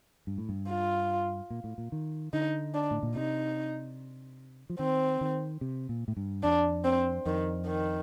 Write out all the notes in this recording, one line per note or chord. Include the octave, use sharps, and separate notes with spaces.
G2
A2
G2
F4
A#2
A2
A#2
D#3
D3 D#4
D4
A2
A#2
C3 D#4
F3
D#3 C4
D#3
C3
A#2
A2
G2
F2 D4
C4
F2 D#3
D#3